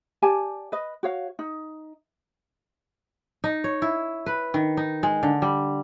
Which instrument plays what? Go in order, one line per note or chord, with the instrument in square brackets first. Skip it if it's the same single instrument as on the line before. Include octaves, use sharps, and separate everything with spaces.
[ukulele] G4 D5 G#5 A5
B4 D#5
F#4 C#5 F5
D#4
[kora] D#4
C#5
E4
B4
D#3
D#4
G#3
D3
G3